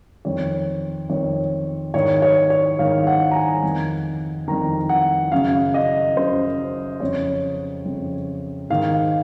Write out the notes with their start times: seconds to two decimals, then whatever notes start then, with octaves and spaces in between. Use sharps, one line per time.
0.25 F2 D#3 C#5
1.10 F2 D#3 C#5
1.94 G#2 D#3 C#5
2.22 C#5
2.50 C#5
2.79 G#2 D#3 F5
3.07 F#5
3.31 A#5
3.35 G#5
3.63 F2 D#3
4.48 F2 D#3 A#5
4.89 F#5
5.32 F#2 C#3 F5
5.74 D#5
6.16 F#2 C#3 C5
7.00 F2 C#3 C#5
7.85 F2 C#3
8.70 G#2 D#3 F5